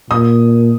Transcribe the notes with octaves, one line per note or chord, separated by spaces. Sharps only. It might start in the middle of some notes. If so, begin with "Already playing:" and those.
A#2 D#6